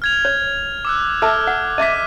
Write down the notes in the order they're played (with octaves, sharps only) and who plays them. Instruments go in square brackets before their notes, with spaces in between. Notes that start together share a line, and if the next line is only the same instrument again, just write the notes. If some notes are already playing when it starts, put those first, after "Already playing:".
[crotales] F6 G#6 F7
[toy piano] C#5
[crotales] D6 E6 F#6
[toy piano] A4 E5 A5 [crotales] D6 E6 F6
[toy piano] F#5
[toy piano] D#5 E5 D6 [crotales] B6 D#7